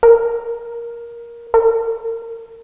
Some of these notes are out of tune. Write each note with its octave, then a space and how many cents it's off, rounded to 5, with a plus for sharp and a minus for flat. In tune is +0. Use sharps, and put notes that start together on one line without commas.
A#4 +10
A#4 -30